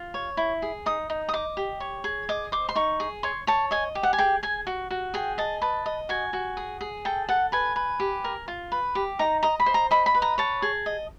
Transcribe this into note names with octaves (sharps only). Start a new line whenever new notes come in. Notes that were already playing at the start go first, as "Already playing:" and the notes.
Already playing: F4
C#5
E4
G#4
D#4 D#6
D#4
D#6
D#5 D6
G4
C#5
G#4
D#5 D6
C5 D6
C6
D#4 C#6
G#4
C#5 C6
C#5 A5
D#5 G#5
G4
F#5
G#5
G#4 G5
G#4 G#5
F#4
F#4
G#4 G5
D#5 A5
B4 A5
D#5
F#4 G#5
F#4
G#4
G#4
A4 G5
A4 F#5
B4 G#5
B4
G4
A#4
F4
B4
G4
D#4 A#5
D#5 A#5
B5
C5
A#5
D#5 B5
B5
B4
A#5
C#5 A5
G#4
D#5